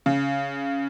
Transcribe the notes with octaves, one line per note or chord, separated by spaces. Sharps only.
C#3